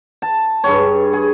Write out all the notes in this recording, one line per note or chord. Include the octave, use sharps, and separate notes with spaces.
A5
G2 G#4 C#5
G#4